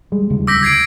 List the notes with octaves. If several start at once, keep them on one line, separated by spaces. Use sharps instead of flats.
G3 G#3
D1 C#3 G3
D6 E6 G6 A#6 B6
G#6 C7 D7